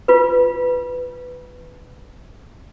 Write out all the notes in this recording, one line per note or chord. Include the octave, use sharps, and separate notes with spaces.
F4 B4